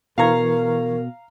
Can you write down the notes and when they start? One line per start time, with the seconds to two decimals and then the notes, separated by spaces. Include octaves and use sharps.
0.18 B2 E3 A#4 F5 A#5 C#6 G#6